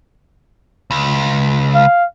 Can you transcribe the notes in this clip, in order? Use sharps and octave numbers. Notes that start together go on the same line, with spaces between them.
C#2
F5